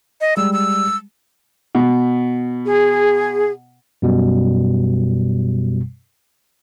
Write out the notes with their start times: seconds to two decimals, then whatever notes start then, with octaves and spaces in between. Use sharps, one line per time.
0.21 D#5
0.37 G3 G#3 E6
0.53 E6
1.75 B2
2.66 G#4
4.02 F#2 B2 G3